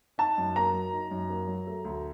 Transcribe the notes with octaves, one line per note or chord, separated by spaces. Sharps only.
D#4 A5
F#2
A#3 A#5
F#3
D#4
F#2
A#3
F#3
A3
D2